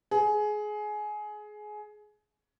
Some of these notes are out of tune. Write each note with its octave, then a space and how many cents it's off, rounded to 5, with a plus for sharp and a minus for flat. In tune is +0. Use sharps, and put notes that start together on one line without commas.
G#4 +20